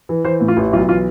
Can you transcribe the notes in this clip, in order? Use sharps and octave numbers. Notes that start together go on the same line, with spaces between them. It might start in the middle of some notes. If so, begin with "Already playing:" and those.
E3
E3 C5
A2
F4
A1
B1 F4
E3 F4